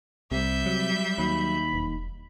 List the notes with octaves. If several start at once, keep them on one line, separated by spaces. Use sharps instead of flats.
C2 C3 G3 E5 G6
F#3
D#2 F#3 B5
E1